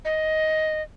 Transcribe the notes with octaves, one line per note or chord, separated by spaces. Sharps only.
D#5